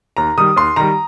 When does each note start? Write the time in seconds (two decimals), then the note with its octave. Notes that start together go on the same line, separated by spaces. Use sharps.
0.17 D#2 A#5
0.37 D#3 G3 D#6
0.56 D#2 C6
0.76 D#3 G3 A#5